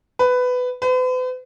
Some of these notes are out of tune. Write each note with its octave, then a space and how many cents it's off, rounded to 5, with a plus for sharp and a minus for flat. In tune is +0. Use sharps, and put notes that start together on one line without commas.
B4 +15
B4 +45